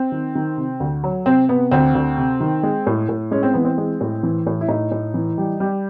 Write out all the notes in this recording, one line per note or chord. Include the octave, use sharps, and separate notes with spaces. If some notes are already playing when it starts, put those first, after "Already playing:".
Already playing: C4
D#3
D#3
C3
D2
F#3
C3 C4
C3 B3
D2 C4
D2
C3
D#3
G#3
A2
A2
G#3 C#4
C4
E3 B3
C4
G#3
A2
E3
A2
E4
A2 D#4
A2
E3
G3
G3